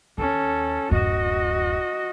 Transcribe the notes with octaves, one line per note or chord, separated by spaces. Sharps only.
D#2 C#4 A4
D1 F#2 F#4 D#5